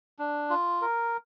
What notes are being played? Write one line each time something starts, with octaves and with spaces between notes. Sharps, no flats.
D4
F4
A#4